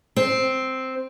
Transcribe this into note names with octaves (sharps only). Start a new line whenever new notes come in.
C4